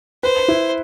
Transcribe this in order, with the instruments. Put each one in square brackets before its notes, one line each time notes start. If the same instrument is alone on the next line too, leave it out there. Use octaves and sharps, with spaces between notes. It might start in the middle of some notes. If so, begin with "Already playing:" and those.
[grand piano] B4 [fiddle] C5
[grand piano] E4